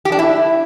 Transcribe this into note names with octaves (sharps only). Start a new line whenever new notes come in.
G4
D4
E4